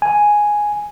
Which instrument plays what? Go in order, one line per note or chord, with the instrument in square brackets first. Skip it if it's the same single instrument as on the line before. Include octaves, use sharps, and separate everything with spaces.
[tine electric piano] G#5